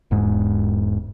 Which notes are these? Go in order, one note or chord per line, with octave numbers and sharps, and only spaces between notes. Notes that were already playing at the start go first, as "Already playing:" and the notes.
E1 G#2 G#3